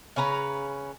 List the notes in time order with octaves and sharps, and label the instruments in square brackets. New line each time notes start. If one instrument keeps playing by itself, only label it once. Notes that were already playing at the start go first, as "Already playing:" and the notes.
[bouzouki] C#3 C#4 B4 A#5